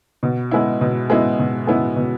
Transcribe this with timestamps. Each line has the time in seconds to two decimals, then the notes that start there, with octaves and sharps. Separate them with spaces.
0.23 B2
0.51 G#3 B3 E4
0.81 B2
1.10 G#3 B3 E4
1.39 B2
1.67 G#3 B3 E4
1.96 B2